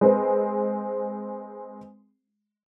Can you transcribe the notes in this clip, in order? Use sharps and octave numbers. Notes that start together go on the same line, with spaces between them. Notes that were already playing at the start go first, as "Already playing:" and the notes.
G#3 C4 B4